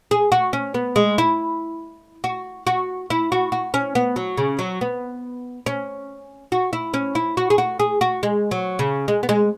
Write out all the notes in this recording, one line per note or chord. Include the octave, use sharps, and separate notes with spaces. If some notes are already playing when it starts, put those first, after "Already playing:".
G#4
F#4
C#4
B3
G#3
E4
F#4
F#4
E4
F#4
F#4
C#4
B3
F#3
C#3
F#3
B3
C#4
F#4
E4
C#4
E4
F#4
G#4
F#4
G#4
F#4
G#3
F#3
C#3
G#3
B3
G#3